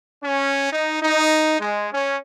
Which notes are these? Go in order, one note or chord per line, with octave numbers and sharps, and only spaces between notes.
C#4
D#4
D#4
G#3
C#4